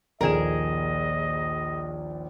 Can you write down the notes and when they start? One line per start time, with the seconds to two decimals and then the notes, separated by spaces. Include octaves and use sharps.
0.21 A#1 D#2 G#4 A#4 D#5 E7